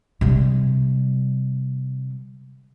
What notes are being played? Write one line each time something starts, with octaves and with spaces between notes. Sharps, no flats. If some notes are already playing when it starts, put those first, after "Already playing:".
C3 G3